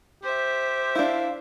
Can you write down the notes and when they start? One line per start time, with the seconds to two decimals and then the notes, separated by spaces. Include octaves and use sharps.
0.23 G4 C5 E5
0.95 D4 E4 F5